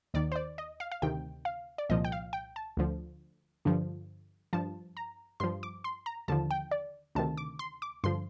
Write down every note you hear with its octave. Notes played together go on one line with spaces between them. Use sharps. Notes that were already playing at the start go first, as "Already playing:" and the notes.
D#2 D#3 D5
C5
D5
D#5
F5
F5
D2 C3 D#3 G5
F5
D5
C2 A#2 F3 D#5
G5
F5
G5
A5
D2 D3 F3
G2 D3 F3
G2 F3 A5
A#5
G2 F3 C6
D6
C6
A#5
D#2 D3 F3 A5
G5
D5
D2 C3 D#3 A5
D6
C6
D6
G2 D3 F3 C6